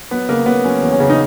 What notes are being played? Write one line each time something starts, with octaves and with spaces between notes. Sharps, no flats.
F#3 B3
C#3 A#3
C#3 B3
F#3 C#4
E2
C#4
C#3
D#4